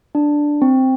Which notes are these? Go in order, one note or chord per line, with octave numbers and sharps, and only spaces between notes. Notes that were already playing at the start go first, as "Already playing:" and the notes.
D4
C4